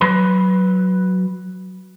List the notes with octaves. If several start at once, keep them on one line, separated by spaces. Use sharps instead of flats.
F#3 B4 B5